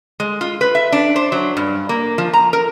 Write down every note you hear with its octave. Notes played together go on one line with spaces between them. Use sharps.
G#3
F4
B4
E5
D4
C5
F#3
G2
A#3
F3
A#5
A#4